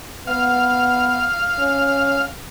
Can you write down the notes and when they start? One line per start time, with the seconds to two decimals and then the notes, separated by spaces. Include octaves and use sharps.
0.27 B3 F5
1.59 C#4